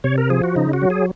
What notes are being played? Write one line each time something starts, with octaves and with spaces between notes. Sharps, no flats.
C3 C#5
A#4
F3 G#4
F#4
C#3 D#4
F#4
F#3
G#4